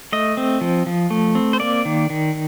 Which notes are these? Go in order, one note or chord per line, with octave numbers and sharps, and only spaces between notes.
A3 D#5
C4
F3
F3
A3
C4
C5
A#3 D5
D#3
D#3